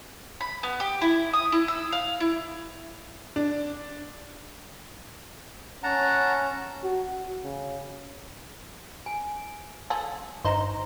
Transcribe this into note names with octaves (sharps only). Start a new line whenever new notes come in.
B5
B3
G4
E4
D#6
E4
E6
F5
E4
D4
C#4 F#5 A5 A#5
F#4
C#3
G#5
F4 G#4 A4
G1 D#4 C5 A#5 C6